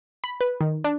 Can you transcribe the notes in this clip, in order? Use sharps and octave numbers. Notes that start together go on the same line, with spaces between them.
B5
B4
D#3
D4